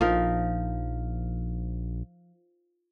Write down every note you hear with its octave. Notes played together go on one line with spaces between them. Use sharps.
A#1 F3 D#4 A#4